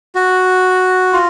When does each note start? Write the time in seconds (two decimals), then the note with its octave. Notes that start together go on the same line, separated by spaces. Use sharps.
0.15 F#4
1.13 F4